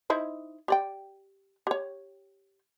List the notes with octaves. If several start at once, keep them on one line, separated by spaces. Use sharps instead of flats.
D#4 E4 C5
G4 D5 G5
G4 C#5